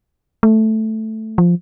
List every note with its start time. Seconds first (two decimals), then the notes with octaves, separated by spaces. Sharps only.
0.43 A3
1.38 F3